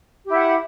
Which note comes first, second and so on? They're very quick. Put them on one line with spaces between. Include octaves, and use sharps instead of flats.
G4 E4 F#5